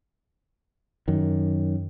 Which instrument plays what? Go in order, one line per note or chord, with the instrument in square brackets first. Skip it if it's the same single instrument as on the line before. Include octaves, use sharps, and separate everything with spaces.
[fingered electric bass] F#2 D#3